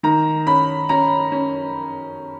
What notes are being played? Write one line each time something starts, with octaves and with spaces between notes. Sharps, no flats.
D#3 A#5
C#4 B5
C#4 A#5
C#4